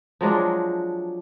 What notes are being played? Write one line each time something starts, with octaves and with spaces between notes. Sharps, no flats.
F3 F#3 G#3 D4